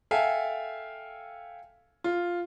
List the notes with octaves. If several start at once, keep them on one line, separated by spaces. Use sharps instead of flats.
A4 E5 F5 G5 G#5
F4